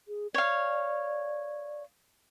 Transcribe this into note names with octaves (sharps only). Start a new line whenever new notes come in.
G#4
C#5 D5 F5